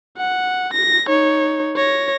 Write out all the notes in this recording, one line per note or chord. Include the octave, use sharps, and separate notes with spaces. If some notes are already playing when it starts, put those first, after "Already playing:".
F#5
A#6
D#4 C#5
C#5 A#6